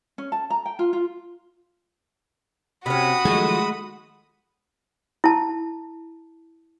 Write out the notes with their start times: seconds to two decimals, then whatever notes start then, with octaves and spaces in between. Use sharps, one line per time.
0.18 C#4
0.32 A5
0.50 A#5
0.66 G5
0.79 F4
0.93 F4
2.86 C3 C#4 F#4 B5 D#6
3.25 D#3 F3 F#3 G#3 A3 G#4
5.24 E4 A5